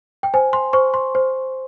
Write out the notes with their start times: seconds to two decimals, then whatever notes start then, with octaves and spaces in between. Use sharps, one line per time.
0.23 G5
0.34 C5 G#5
0.53 C6
0.73 C5 C#6
0.94 C6
1.15 C5